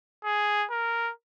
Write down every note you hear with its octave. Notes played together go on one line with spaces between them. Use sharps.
G#4
A#4